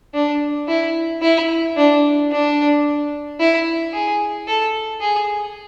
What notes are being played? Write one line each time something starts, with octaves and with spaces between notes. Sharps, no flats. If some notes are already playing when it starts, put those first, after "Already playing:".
D4
E4
E4
D4
D4
E4
G#4
A4
G#4